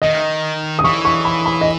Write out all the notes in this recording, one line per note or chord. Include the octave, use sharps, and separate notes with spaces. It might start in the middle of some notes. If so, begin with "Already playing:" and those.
D#3 D#5
D#6
E3 C#6
C#6
B5
B5
D#5